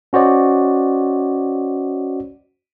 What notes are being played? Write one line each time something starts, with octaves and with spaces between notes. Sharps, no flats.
C#4 F#4 C5 D5 D#5